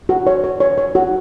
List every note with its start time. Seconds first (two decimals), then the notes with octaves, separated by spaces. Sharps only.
0.09 F#4
0.27 C#5
0.44 C#5
0.60 C#5
0.78 C#5
0.95 F#4